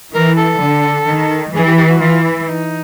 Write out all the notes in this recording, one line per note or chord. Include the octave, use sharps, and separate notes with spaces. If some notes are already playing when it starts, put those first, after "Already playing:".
E3 A#4
A4
D3
D#3
E3 G#4
G4
G4
F#4
E3 F4
E4
D#4